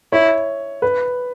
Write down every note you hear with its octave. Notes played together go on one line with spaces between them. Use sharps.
E4 C#5
B4